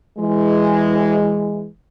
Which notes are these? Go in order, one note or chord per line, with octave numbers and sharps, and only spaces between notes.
E3 G#3